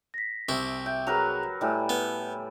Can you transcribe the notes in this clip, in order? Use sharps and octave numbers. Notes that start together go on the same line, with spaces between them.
A#6 B6
C2 E4 G4
E5 G5
F#3 G#4 A#4 B4 F#6 F7
A2 G3 E5 G5 G#5
B3